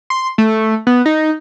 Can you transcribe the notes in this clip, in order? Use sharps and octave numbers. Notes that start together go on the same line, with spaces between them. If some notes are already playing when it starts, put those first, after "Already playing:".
C6
A3
B3
D#4